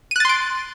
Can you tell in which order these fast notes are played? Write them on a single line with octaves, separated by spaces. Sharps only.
D#7 F#6 A6 C6 D7